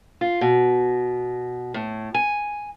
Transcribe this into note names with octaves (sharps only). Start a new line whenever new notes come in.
F4
B2
A2
G#5